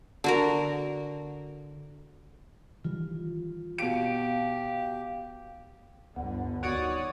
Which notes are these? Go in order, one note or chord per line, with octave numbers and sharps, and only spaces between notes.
D3 F#4 A#4
D#3 E3 G3 F4
B2 G4 F5 D7
G1 D2 D3 B3
D#3 F#4 C#5 D5 F#5 D#6